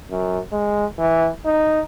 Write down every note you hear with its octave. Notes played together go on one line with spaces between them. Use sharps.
F#2
G#3
E3
D#4